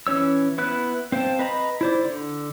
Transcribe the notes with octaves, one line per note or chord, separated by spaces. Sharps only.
E3 C#4 C#5 E6
B3 E4 B4 F#6
C4 C5 F5 G5 A5
B4 D#5 A#5 B5
E4 C5 D5
D3